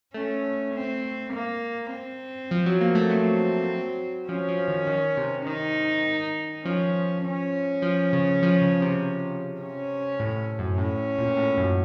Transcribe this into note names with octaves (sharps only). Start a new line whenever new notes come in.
A3 C#4
C4
A#3
C4
F3
F#3
A#3
A3
F#3 C4
F3 C#4
F3
D#3
D#3
C3
D#3 D#4
F3 C#4
C#4
F3
C#3
F3
C#3
C3
C#4
A2
F#2
A2 C#4
A#2
A2
F#2